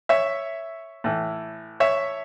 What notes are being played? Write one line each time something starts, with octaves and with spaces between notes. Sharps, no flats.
C#5 E5
A2 E3
C#5 E5